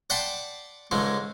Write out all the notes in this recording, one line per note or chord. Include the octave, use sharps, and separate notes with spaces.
D5 F#5 G5 A5 B5 C6
C#2 G#2 G#3 A3